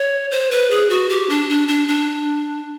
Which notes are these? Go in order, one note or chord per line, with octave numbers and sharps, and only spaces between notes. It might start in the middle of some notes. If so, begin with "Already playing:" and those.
Already playing: C#5
C5
B4
G#4
F#4
G4
D4
D4
D4
D4